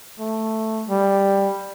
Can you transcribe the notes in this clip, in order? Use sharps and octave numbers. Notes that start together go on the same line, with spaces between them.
A3
G3